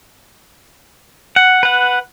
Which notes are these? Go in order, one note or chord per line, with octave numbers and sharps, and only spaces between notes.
F#5
B4 F#5